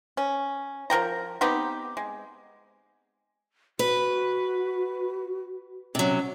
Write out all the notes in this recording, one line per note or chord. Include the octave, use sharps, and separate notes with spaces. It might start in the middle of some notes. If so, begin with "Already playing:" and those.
C#4
F3 A#4 G5 A#5
B3 C4 D#4 G4
G#3
F#4 B4
C3 F#3 C#4